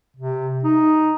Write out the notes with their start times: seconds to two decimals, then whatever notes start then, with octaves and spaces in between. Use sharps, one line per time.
0.16 C3
0.64 D#4